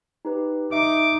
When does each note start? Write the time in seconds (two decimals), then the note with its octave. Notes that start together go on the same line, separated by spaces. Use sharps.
0.25 D#4 G4 B4
0.72 D#4 E5 D6